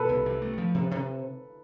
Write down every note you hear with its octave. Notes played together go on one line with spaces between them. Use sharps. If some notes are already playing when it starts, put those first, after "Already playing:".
Already playing: B2 A4 B4
C2
C3
A3
F3
C3
C3